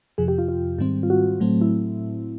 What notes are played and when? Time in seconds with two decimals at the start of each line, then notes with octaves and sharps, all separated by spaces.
0.18 F2 C3 F3 G#4
0.28 G4
0.38 F4
0.48 F4
0.79 G#2 D#3 G3 C4
1.03 F4
1.10 F#4
1.40 A2 F#3 A3 C4
1.61 E4